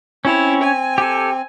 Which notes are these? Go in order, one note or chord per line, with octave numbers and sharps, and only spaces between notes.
C4 C#4 E4 C#5
G#5
G4 A4